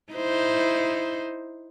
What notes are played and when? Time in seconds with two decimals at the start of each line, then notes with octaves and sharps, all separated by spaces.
0.13 D#4 E4 C5